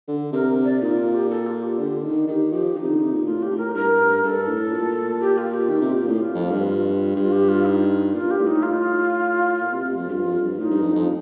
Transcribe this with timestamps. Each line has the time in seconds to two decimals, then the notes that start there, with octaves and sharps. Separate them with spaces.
0.08 D3
0.32 C3 A#4
0.65 D5
0.81 A#2 D#4
0.98 F4
1.14 G4
1.30 A4
1.47 F4
1.63 G4
1.79 D3
2.03 D#3
2.27 D#3 G4 A4
2.53 F3 G4
2.77 D#3 D#4
2.83 C3
2.89 D3
3.01 C3
3.13 A#2
3.25 A2 F4
3.43 G4
3.50 A2
3.58 A#4
3.74 G2 A#4
4.23 G2 A4
4.47 A2
4.72 A#2
5.20 G4
5.38 F4
5.54 G4
5.70 D#3
5.82 C3
5.94 A#2
6.07 A2
6.18 F4
6.35 F2
6.51 G2
6.67 F4
7.16 G2 F4
7.32 G4
7.49 F4
7.65 D#4
8.14 A#2 F4
8.31 G4
8.38 A2
8.47 D#4
8.63 F4
9.61 A#2
9.73 C3
9.85 C3
9.97 F2
10.09 G2 F4 G4
10.26 F2
10.41 G2
10.58 A2 D#4
10.71 G2
10.82 F2
10.95 F2